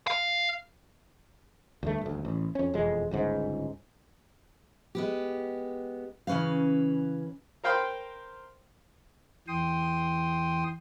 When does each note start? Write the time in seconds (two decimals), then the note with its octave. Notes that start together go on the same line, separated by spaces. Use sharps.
0.07 F5
1.83 D2 G2 A3
2.01 D#1 D2
2.25 A1
2.55 F2 C#4
2.74 E1 F2 G#3
3.11 G1 C#2 G#2
4.95 G#3 B3 G4
6.27 C#3 E3 C#4 B4 F5
7.64 A#4 C5 F5 G5 B5 C6
9.48 E2 E3 G5 C6 D#6